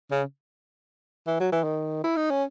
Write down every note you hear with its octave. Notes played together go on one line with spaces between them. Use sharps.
C#3
E3
F#3
E3
D#3
E4
D#4
C#4